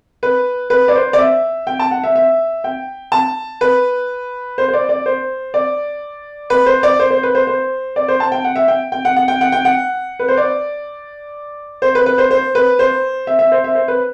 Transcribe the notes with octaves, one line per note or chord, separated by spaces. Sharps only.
B4
B4
D5
C5
D5
E5
G5
A5
F#5
E5
E5
G5
A5
B4
C5
C5
D5
D5
C5
D5
B4
C5
D5
C5
C5
B4
C5
C5
D5
C5
A5
G5
F#5
E5
G5
G5
F#5
F#5
G5
F#5
G5
F#5
B4
C5
D5
C5
B4
B4
C5
C5
B4
C5
E5
E5
C5
E5
C5
B4